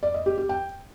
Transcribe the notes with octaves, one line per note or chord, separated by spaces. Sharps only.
D5
D#5
G4
G4
G5